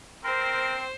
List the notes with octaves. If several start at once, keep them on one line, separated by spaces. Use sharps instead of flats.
C4 A#4 C5